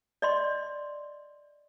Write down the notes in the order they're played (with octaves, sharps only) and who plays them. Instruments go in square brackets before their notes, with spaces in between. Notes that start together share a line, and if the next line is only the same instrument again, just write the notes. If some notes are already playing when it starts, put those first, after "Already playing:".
[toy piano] D5 D#5 C6